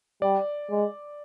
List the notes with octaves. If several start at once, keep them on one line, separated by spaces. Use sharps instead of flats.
G3 D5
G#3